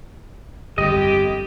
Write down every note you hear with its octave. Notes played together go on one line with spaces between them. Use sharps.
G1 F2 G4 D#5